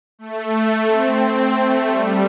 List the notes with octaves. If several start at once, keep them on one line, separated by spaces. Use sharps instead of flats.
A3
C4
C4
A3
G3